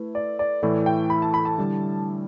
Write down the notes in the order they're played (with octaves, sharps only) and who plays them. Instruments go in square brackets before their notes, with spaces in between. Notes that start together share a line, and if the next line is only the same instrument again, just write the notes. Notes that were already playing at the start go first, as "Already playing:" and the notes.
Already playing: [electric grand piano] A3 E4 B4
[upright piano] D5
D5
[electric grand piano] A2 E3 A3 E4 [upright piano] D5
[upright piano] G5
B5
A5
B5
A5
[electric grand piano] D3 G3 E4